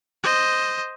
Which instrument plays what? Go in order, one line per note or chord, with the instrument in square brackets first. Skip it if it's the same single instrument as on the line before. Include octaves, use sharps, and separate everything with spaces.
[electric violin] C5 D#5